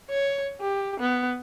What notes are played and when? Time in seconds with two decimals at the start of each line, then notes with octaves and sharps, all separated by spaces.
0.10 C#5
0.61 G4
1.00 B3